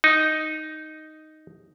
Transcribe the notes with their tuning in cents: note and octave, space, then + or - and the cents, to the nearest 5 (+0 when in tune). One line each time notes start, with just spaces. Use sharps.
D#4 +0